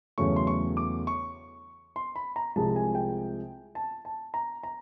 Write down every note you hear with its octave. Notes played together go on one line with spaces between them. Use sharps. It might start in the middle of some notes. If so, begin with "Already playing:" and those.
E2 C#3 F#3 A3 C#4 C#6
C6
C#6
D6
C#6
C6
B5
A#5
C2 C3 F3 G#3 A5
G#5
G5
A5
A5
A#5
A#5